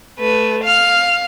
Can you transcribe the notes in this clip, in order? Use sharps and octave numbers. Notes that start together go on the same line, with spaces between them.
A3 B4
F5 F6